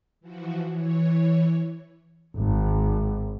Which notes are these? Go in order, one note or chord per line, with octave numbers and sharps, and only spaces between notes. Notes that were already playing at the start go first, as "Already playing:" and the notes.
E3 F3 F#4
E3 C#5
G#1